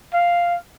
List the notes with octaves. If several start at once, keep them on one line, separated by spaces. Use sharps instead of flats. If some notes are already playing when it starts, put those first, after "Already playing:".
F5